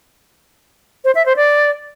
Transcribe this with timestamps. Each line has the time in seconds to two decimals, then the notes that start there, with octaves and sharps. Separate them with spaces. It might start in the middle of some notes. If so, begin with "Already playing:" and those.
1.04 C5
1.15 E5
1.26 C5
1.36 D5